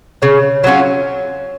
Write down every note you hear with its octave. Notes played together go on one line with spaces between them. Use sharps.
C#3 C#5
C#5
F#3 C#4 F4 C#5